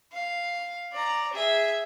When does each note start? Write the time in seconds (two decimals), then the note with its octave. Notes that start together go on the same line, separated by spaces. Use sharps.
0.12 F5
0.92 D5 A#5
1.33 G#4 E5